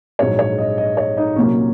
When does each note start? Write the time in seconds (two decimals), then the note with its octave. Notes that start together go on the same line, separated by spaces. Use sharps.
0.19 A#1 G#2 F#3 C#5
0.39 C#5
0.58 D#5
0.78 D#5
0.97 C#5
1.17 D#4
1.36 C2 A#2 F#3 A#3 C#4